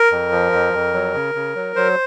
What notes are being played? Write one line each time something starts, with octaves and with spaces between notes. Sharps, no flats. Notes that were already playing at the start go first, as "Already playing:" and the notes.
Already playing: A#4
F2
F3
F2
F2
F#3
C#3
C#3
F#3
F#3 C5